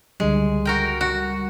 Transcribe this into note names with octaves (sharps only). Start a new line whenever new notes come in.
C#2 D3 G3 G#3
F#4 A#4 G5
F#4